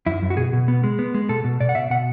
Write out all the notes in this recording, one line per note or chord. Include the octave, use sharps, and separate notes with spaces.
F#2 E4
F#2
F#4
B2 G#4
B2
B3
G#3
B3
G#3
B2 A4
B2
B2 D5
F#5
B2 E5
B2 F#5